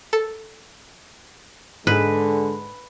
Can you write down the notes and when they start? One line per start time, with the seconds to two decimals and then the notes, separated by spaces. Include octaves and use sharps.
0.13 A4
1.87 G#2 D3 G#3 B4